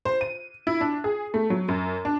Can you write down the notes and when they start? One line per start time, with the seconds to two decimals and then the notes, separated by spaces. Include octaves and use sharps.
0.05 C5
0.21 D#7
0.67 E4
0.81 D4
1.04 G#4
1.34 A3
1.50 F#3
1.68 F#2
2.05 D4